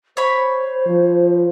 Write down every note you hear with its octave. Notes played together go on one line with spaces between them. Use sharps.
C5 C#5 B5
F3